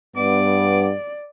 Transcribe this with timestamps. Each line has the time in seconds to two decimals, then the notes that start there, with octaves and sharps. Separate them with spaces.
0.16 G2 B3 D5 D6